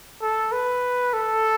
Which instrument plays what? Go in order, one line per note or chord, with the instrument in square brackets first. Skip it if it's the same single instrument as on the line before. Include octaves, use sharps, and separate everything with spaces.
[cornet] A4
B4
A4